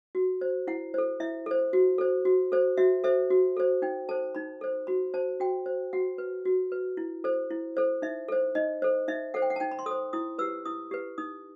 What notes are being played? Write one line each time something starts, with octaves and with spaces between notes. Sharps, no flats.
F#4
C5
E4 F#5
A4 C5
E4 E5
A4 C5
F#4
A4 C5
F#4
A4 C5
F#4 E5
A4 C5 E5
F#4
A4 C5
D#4 G5
A4 C5 A5
D#4 B5
A4 C5
F#4 B5
C5 A5
F#4 G5
C5
F#4 F#5
B4
F#4
B4
E4
A4 C5
E4
A4 C5
D#4 E5
A4 C5
D#4 D#5
A4 C5
D#4 E5
A4 C5 F#5
G5
F#5
A5
D#4 G5
B5
C6
A4 C5 D#6
E4 D#6
G4 B4 E6
E4 D#6
G4 B4
D#4 D#6